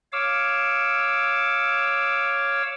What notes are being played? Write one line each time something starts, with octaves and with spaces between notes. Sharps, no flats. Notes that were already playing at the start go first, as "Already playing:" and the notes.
C#5 F5 D6 E6